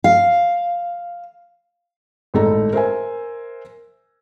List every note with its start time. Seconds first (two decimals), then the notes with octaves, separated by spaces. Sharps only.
0.04 F5
2.34 G#1 A2 D#4 A4 A#5
2.73 A#4 C5 E5 G#5